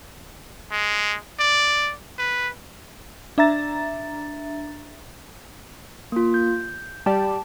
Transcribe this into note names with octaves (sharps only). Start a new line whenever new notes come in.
G#3
D5
B4
D4 E5 A#5 A6
A#3 F4
G6
G3 G4 D5 A5